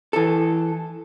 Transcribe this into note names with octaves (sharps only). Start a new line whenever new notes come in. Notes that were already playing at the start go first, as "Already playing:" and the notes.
E3 A4